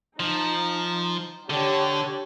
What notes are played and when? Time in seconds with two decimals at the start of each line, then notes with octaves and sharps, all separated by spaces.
0.20 F3 D#4
1.50 D3 D4 G4 C#5